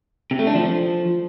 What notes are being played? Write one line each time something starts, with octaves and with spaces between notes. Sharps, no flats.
C3
A3
D4
F3